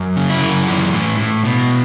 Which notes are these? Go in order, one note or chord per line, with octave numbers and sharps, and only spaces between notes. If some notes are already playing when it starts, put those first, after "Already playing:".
Already playing: F#2
C#3
E4
F#2
E3
A2
A2
B2